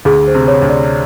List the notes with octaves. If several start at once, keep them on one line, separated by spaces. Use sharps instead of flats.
D2 G#4
C5
C3
C#5
D2
D5